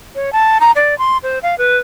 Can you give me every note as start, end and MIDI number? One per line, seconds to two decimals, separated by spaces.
0.15 0.32 73
0.33 0.58 81
0.60 0.71 82
0.76 0.97 74
0.99 1.18 84
1.23 1.39 72
1.43 1.58 77
1.58 1.78 71